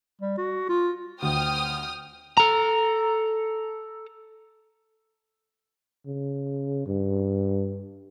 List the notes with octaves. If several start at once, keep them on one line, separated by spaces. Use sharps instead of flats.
G3
F#4
F4
D2 G5 D#6 F6
A4 A#5
C#3
G2